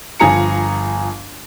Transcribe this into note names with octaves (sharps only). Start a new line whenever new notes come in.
G1 F3 G#4 A#5 C#7